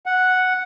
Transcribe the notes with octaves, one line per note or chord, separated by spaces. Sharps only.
F#5